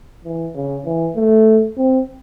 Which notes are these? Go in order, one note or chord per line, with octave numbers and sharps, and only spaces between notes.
E3
C#3
E3
A3
C4